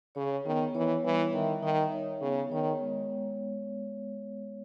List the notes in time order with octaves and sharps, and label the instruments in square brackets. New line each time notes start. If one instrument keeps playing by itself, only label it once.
[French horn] C#3 [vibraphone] C#5
[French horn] D#3 [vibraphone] B3
[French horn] E3 [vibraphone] C#5
[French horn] E3 [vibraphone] G3
[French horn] D#3 [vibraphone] E5
[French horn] D#3 [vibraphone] D#4
[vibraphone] C#5
[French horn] C#3 [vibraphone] B3
[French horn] D#3 [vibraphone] C#5
[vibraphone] G#3